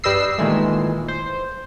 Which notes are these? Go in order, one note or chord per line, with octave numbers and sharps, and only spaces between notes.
G2 G3 B4 D#5 E6 C7
A#2 D#3 E3 G#3 A3
C5